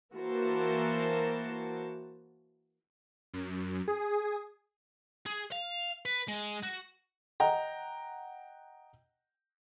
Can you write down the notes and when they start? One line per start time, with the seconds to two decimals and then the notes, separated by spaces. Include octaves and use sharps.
0.16 E3 A#3 F#4 A#4 C5 A5
3.34 F#2
3.88 G#4
5.26 G#4
5.52 F5
6.06 B4
6.28 G#3
6.63 F#4
7.40 D#5 F#5 G5 A#5